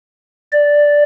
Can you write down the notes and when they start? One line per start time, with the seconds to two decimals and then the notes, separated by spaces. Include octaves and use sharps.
0.53 D5